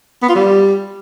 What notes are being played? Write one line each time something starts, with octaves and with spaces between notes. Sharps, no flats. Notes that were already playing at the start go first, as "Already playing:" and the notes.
B3
F4
G3